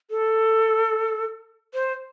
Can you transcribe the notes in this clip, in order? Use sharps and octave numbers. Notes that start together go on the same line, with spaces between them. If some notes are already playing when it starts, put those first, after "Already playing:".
A4
C5